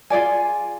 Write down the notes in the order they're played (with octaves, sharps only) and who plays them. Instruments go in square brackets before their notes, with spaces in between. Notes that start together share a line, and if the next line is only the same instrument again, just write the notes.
[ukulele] F4 G#4 D5 G#5